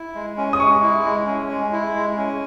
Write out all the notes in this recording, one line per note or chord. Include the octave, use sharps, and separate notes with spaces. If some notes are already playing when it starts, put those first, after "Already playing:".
Already playing: E4
G#3
C#4
D#6
G#3 C#6
E4
G#3
C#4
G#3
E4
G#3
C#4